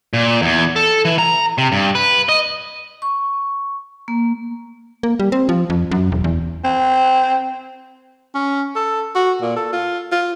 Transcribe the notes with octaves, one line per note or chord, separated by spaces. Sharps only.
A#2
E2
A4
E3
A#5
C3
G2
B4
D#5
C#6
A#3
A#3
G3
C4
F3
F2
F#2
E1
E2
C4
C#4
A4
F#4
A#2
A4
F4
F4